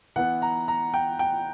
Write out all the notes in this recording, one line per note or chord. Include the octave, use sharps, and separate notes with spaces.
E3 B3 F#5
A#5
A#5
G5
G5